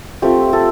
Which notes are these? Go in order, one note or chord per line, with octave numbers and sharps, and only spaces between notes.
A3 C4 F4 G4
A4